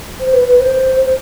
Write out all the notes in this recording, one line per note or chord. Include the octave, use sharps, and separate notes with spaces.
C5
B4
B4
C5
C5